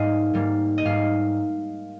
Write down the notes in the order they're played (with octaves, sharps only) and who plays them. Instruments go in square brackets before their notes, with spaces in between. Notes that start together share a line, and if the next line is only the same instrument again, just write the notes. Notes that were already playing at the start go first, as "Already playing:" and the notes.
Already playing: [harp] G#2 G3 A#3 D#5 F5
G#2 G3 A#3
D#5
G#2 G3 A#3 F5